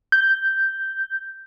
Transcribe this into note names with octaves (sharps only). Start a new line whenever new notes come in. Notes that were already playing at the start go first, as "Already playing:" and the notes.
G6